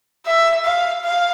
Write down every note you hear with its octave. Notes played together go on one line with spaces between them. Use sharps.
E5
F5
F5